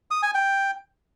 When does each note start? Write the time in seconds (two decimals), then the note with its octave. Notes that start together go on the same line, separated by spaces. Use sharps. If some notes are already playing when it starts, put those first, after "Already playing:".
0.11 D#6
0.23 G#5
0.35 G5